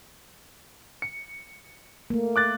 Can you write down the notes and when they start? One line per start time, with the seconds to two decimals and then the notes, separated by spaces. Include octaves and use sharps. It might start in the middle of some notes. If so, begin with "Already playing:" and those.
1.02 C#7
2.10 A3 A#3
2.36 D6 F#6 A6